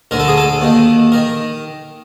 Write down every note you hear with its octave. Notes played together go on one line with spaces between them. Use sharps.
D2 D3 A#4
A4
G#4
A4
D#2 D#3
D#3 A#4